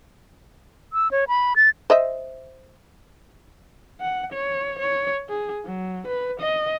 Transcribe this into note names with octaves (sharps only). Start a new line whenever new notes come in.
E6
C#5
B5
A6
C5 D#5 E5
F#5
C#5
C#5
G#4
F#3
B4
D#5